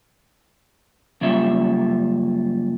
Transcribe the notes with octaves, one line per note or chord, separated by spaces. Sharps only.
F#2 C#3 G3 A#3 F4 E5